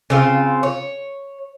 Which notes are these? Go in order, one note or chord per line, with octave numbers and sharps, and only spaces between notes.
C#3 C4 F4
C#5